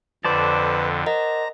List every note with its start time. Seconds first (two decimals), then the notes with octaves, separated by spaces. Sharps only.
0.25 F2 D3 B4 C5 D5 A5
1.06 A#4 D#5 F#5 A#5